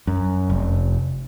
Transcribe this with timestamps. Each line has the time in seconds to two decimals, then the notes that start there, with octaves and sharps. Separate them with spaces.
0.07 F#2
0.50 F1